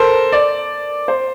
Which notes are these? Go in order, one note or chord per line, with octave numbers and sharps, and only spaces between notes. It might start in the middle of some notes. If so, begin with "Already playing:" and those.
Already playing: A4 A#4 C5
D5
C5